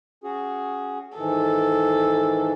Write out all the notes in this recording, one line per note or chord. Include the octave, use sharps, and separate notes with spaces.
C#4 F#4 G#4
G#2 D#3 E3 A4